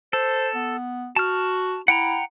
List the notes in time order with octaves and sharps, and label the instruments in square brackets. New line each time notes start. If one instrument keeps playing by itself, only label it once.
[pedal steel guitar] A4 [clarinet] C5
[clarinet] B3
[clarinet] F#4 [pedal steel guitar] A5 F6
[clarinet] E4 [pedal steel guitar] F#5 G5 A#5